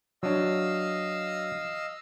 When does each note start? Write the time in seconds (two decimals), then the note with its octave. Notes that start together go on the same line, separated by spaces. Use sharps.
0.23 F#3 D4 D#5 F5 E6